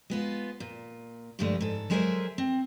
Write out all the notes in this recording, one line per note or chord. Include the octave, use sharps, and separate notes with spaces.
G#3 B3 F4
A#2
G2 A#2 D3 F3 G#3 A3
G#2 A4
F#3 G#3 G#4 A#4 C5 E5
C4